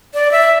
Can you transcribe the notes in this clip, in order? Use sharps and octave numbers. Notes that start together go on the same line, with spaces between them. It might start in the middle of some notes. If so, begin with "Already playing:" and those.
D5
E5